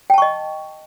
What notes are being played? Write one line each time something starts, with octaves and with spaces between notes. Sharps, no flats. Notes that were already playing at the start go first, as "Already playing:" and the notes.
D#5 G5 A5 C#6